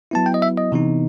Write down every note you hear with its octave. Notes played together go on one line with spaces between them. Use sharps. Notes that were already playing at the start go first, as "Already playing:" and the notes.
F#3 B3 E4 A5
G5
D#5
E5
D#5
C3 E3 B3 D#4